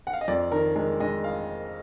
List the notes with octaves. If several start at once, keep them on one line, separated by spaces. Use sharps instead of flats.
F#5
F5
D#5
F2 D5
D#3 A#4
G#3 A#4
G#3 D#5
F5